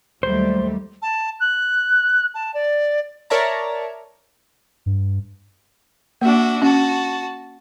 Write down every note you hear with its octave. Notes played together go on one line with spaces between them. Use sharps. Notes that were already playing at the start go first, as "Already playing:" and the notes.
D#2 F#3 G3 A3 C5
A5
F#6
A5
D5
A#4 C#5 D5 E5 A5 A#5
G2
A#3 D4 F#4 E5
C#4 F#4 A5